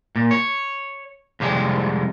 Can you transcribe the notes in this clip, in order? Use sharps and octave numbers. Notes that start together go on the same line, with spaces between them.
A#2
C#5
F2 C3 G3 G#3